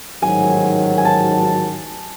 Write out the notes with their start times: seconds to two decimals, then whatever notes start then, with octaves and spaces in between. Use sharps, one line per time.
0.22 A1 G#2 D#3 F#3 G#5
0.98 G#5
1.05 A5